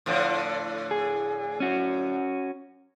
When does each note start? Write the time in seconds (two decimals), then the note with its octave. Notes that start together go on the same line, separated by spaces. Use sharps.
0.06 A2 D3 F3
0.91 G#4
1.60 C#4 F#4